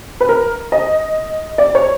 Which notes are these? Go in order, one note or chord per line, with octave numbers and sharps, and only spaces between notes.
B4
A#4
D#5
D5
C#5